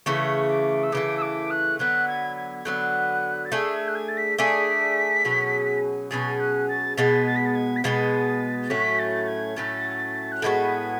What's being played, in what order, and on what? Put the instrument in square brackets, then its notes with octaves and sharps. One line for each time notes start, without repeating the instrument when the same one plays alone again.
[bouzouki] C#3 E3 A3 [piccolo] C#6
[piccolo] D6
E6
[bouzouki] C#3 E3 A3 [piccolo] D6
[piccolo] E6
D6
F#6
[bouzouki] D3 F#3 B3 [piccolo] F#6
[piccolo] G#6
G#6
G#6
[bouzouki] D3 F#3 B3 [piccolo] F#6
[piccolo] A6
[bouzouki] A3 D4 G#4 [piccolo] G#6
[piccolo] G#6
F#6
G#6
A6
B6
[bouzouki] A3 D4 G#4 [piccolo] B6
[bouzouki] B2 F#3 C#4 G#4
[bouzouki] B2 F#3 C#4 G#4 [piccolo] A6
[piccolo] F#6
A6
[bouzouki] B2 G#3 B3 [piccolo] A6
[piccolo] A6
B6
A6
G#6
B6
[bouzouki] B2 G#3 B3 [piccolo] A6
[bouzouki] A2 F#3 A3 C#4 [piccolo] B6
[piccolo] A6
G#6
[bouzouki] A2 F#3 A3 C#4 [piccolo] A6
[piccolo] F#6
[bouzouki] A2 G#3 B3 F#4 [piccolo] G#6